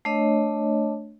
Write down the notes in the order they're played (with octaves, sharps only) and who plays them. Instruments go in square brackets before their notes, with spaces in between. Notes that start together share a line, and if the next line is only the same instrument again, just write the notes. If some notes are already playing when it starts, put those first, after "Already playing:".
[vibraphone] A3 D4 C#5 D#5